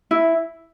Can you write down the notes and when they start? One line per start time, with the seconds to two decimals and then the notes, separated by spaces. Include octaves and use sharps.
0.11 E4